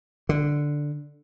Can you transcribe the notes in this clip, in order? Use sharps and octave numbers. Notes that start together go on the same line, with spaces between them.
D3